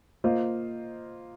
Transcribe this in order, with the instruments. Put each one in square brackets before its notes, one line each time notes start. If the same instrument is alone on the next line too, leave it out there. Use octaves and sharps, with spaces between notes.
[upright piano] A#3 F4 C5 D#5